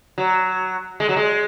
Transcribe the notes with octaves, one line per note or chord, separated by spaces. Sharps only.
F#3
G#3
F#3
G#3